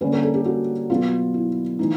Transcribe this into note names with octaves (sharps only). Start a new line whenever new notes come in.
D3 G3 A#3 C#4 B4
A#4
A4
G4
F#4
B2 F#3 B3 F4
E4
E3 A3 D#4